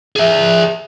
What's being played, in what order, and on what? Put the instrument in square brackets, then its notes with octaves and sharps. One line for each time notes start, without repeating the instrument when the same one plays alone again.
[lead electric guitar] G#4 E5